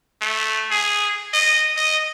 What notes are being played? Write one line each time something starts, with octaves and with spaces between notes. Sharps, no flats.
A3
G#4
D#5
D#5